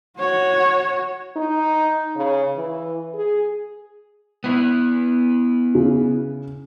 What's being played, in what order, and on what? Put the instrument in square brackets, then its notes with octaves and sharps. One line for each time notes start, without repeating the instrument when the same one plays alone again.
[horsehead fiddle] F#4 C#5
[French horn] D#4
C#3
E3
G#4
[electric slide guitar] B3 E4
[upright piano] C#3